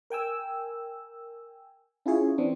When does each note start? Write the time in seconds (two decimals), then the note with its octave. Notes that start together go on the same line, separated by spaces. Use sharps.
0.10 A#4 G5 G#5 E6
2.06 C#4 E4 F4 G#4 C#5
2.38 E3 C4 D4